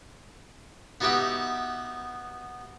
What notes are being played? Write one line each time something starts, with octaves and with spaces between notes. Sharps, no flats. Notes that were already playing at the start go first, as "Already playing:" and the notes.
B3 D#4 F#4 G4 E5 F#5